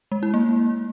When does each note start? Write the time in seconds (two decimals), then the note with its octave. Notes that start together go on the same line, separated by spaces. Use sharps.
0.12 G#3
0.23 E4
0.34 A#3